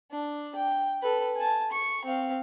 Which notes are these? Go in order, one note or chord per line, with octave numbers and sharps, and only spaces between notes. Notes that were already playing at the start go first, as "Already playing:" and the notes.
D4
G5
A4 B4
G#5 A5
C#6
C4 F5